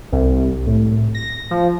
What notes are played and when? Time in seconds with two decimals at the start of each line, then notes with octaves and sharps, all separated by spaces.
0.12 C2
0.67 A2
1.15 A#6
1.51 F3